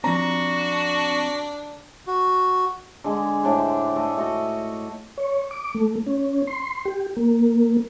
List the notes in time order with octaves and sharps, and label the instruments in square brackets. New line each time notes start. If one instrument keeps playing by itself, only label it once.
[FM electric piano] F3 C4 [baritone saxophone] D4 [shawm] F#4 [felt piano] A#5
[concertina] F#4
[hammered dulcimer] D3 G#3
A2 D4 C5
A3 D#5 C#6
A3 F#4 D#5
[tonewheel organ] C#5
D6
A3
C#4
C6
G4
A#3